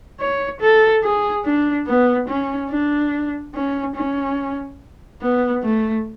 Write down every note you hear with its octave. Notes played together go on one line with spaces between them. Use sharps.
C#5
A4
G#4
D4
B3
C#4
D4
C#4
C#4
B3
A3